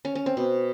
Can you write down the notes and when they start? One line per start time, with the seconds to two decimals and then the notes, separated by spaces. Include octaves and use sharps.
0.05 C#4
0.15 C#4
0.26 C4
0.37 B2